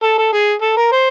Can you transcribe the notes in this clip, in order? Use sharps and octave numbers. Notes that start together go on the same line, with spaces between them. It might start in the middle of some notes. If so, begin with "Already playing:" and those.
A4
A4
G#4
A4
A#4
C5